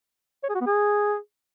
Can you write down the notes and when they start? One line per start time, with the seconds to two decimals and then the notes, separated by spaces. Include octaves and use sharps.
0.43 C#5
0.49 G#4
0.55 F#4
0.61 B3
0.67 G#4